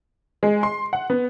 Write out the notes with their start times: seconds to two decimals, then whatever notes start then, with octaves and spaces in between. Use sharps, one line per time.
0.43 G#3
0.63 C6
0.93 F#5
1.10 B3